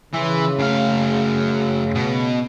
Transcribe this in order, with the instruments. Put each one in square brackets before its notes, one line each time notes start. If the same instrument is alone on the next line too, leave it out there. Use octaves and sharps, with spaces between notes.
[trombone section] C#3 [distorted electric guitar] E3 [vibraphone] E4 E5 C6
[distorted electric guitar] F#2 F5 [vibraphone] A3
[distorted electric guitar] B2